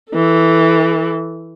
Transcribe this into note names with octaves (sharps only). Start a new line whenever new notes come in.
E3 A4